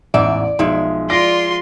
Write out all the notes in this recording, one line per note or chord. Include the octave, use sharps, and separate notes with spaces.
A1 E2 G#2 D5 E5
B1 F3 G#3 E5
F4 D5 C6 A#6 D7